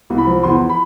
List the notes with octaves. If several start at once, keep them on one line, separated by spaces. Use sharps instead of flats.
C2
B5
F3
E2 C6
B5